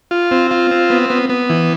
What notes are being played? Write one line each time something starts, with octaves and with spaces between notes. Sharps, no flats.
F4
C4
F4
C4
B3
B3
B3
E3